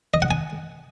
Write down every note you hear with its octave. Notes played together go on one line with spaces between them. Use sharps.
D#5
F#5
G#5